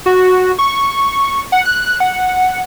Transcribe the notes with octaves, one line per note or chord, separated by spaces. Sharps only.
F#4
C#6
F#5
F#6
F#5